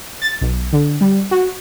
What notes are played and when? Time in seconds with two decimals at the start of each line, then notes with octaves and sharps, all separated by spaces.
0.22 A6
0.41 B1
0.73 D3
1.01 G3
1.31 F#4